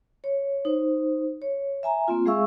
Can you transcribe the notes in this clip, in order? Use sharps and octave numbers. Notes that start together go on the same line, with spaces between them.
C#5
D#4 C5
C#5
E5 G#5 A#5
A#3 C4 F4
G#3 G#4 E5 F5 C#6 E6